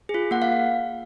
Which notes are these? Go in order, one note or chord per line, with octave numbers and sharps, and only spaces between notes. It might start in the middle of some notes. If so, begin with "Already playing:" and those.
G#4
F4
A#3 F#5
F5